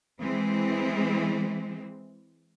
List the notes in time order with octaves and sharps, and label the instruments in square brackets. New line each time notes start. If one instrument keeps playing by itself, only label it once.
[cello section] E3 G#3 C4